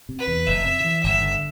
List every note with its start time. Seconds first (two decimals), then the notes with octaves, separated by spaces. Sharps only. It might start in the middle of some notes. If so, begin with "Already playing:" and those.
0.09 C3
0.19 B4
0.28 E2
0.47 F1 E5
0.65 C3
0.84 E3
1.03 G1 E5
1.21 D3